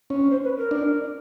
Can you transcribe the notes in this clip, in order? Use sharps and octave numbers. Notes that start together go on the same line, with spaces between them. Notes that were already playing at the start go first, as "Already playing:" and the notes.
C#4
C5
B4
A#4
D4